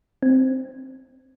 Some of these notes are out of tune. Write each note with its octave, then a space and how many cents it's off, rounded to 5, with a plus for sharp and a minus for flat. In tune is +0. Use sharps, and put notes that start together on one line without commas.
C4 +0